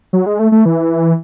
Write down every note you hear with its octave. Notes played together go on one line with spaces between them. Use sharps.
F#3
G#3
A3
A3
E3